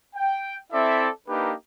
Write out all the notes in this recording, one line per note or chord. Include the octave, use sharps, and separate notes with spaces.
G5
C4 E4 A4 D5 E5
A#3 D4 D#4 G4 A#4 B4